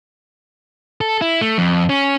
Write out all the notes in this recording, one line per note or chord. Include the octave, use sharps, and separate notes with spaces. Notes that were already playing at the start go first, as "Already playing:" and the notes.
A4
E4
A3
F2
C#4